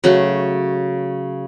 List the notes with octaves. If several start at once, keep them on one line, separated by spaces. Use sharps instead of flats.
C#3 F#3 A3